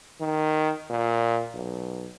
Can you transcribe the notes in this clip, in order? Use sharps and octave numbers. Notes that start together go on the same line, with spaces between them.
D#3
A#2
B1